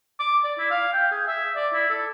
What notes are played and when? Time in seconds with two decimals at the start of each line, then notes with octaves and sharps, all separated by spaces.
0.19 D6
0.44 D5
0.58 E4
0.70 F5
0.93 G5
1.11 G#4
1.27 E5
1.55 D5
1.73 E4
1.90 A4